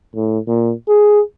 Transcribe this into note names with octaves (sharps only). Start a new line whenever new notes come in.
A2
A#2
G#4